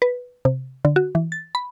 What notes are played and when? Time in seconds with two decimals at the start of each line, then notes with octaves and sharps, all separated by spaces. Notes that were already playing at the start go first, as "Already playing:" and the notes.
0.02 B4
0.45 C3
0.85 D3
0.96 F#4
1.15 E3
1.32 A6
1.55 B5